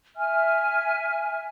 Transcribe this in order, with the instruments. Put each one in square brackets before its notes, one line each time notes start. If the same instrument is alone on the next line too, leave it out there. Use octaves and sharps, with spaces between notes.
[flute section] E5 G#5 F6